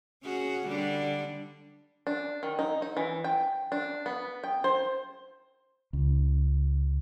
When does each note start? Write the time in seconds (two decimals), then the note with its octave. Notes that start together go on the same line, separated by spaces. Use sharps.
0.24 C#4 F#4 G#4
0.66 D3 G3 D4
2.07 D4
2.43 D#3
2.59 D#4
2.82 D#4
2.97 E3
3.24 G5
3.72 D4
4.06 B3
4.44 G5
4.64 C5
5.93 C#2